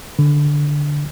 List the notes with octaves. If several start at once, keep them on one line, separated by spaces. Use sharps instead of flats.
D3